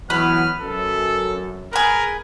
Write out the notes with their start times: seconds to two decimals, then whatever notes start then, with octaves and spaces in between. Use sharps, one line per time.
0.10 E3 F#3 B3 B4 F6
0.62 F#2 A4
1.73 G#4 A#4 B4